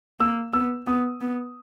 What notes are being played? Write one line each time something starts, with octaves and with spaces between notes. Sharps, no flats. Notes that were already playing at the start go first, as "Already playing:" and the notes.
A#3 E6
B3 E6
B3 D#6
B3